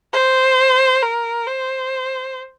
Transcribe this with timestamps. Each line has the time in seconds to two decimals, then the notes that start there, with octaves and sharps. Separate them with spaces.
0.13 C5
1.03 A#4
1.47 C5